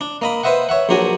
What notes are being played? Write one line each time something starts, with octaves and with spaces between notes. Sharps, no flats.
D4
A#3 D#5 B5
B4 C5 D#5 E5 F#5
C#5 E5 F#5
A#1 F#3 D4 F#4 G#5